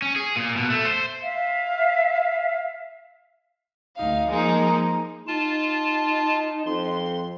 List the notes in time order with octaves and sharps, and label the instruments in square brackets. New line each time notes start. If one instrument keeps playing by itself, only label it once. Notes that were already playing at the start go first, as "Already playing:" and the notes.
[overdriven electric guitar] C#4
G#4
A#2
B2
A3
C5
[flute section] E5 F5
[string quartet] D2 D#4 F5
F3 G#3 A#3 D#4
[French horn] D#4 [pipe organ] F4 A5
[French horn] F2 [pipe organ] C6